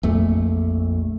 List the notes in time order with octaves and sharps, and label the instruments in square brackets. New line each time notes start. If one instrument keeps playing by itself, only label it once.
[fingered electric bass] A#1 F2 A3